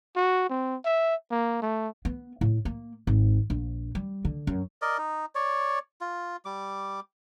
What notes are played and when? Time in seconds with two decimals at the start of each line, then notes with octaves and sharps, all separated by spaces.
0.16 F#4
0.50 C4
0.85 E5
1.31 A#3
1.62 A3
2.05 B3
2.41 A2
2.65 A#3
3.07 G#1
3.50 A#1
3.95 G3
4.25 D3
4.47 F#2
4.82 A#4 D5 D#5
4.98 D#4
5.35 C#5 D5
6.01 F4
6.45 G3 D6